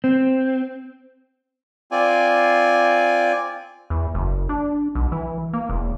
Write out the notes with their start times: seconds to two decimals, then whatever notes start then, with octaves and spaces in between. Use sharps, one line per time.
0.04 C4
1.91 C4 F4 D5 G#5
3.90 E2
4.14 F#1
4.49 D4
4.95 B1
5.12 E3
5.53 A#3
5.69 E1